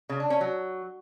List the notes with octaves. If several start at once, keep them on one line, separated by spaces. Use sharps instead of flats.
C#3
D4
C#4
F#3